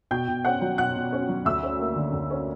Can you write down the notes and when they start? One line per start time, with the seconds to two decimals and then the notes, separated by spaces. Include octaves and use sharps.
0.11 B2 G5 G6
0.28 B2
0.45 C#4 F#5 F#6
0.61 F#3
0.78 B2 F#5 F#6
0.96 B2
1.12 C#4
1.29 F#3
1.45 D2 E5 E6
1.63 C#4
1.79 A#3
1.96 D3
2.13 D2
2.30 C#4